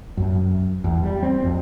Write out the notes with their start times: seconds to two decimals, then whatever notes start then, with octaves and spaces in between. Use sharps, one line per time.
0.17 F#2
0.84 E2
1.03 G3
1.23 C4
1.44 F2